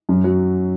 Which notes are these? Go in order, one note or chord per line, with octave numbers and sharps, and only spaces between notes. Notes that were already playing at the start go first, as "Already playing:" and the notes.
F#2
F#3